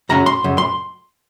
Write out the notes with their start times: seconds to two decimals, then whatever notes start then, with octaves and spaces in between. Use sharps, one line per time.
0.09 F#2 C#3 F#3 C#4 A#5
0.26 C6
0.44 F#2 C#3
0.58 C6